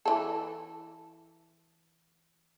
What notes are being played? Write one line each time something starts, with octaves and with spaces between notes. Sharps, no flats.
E3 A4